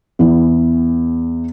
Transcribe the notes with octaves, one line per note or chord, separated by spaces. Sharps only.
E2 E3